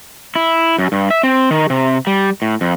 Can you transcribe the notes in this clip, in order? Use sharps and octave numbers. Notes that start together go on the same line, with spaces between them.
E4
F#2
G2
E5
C4
D#3
C3
G3
A2
F2